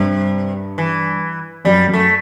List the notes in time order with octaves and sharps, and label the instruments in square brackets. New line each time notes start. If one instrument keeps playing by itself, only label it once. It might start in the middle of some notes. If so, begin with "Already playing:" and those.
Already playing: [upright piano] G2 [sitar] C3
[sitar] E3
[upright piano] F#2 [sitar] G3
[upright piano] F#2
[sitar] A3